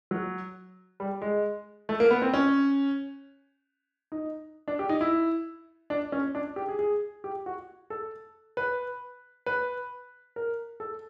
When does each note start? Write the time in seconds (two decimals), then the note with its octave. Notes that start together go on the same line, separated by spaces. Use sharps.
0.11 F#3
1.00 G3
1.22 G#3
1.89 A3
2.00 A#3
2.11 B3
2.22 C4
2.34 C#4
4.12 D#4
4.68 D4
4.79 G4
4.89 D#4
5.01 E4
5.90 D4
6.12 C#4
6.35 D4
6.56 G4
6.69 G#4
6.79 G#4
7.24 G4
7.46 F#4
7.90 A4
8.57 B4
9.46 B4
10.36 A#4
10.80 A4